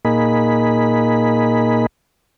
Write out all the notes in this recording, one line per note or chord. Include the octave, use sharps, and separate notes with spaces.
A#2 A#3 D#4 G#4 B5